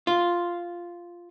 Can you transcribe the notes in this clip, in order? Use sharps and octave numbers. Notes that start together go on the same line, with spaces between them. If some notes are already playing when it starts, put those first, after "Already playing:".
F4